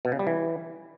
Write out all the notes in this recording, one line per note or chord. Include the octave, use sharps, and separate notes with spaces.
B2
C#3
G3
E3